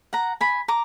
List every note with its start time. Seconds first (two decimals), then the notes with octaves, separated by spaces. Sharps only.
0.13 F#5 A#5
0.41 G#5 B5
0.68 A#5 D6